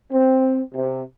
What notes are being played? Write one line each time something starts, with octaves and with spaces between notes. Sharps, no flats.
C4
C3